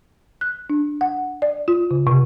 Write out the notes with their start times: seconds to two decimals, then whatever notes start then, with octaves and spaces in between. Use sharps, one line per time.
0.41 F#6
0.70 D4
1.01 F#5
1.42 D5
1.68 F4
1.91 C#3
2.07 C3